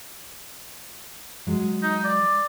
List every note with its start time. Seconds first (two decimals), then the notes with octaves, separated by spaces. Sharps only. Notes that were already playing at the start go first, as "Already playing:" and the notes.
1.47 F#3 G#3
1.82 D#4
2.04 D5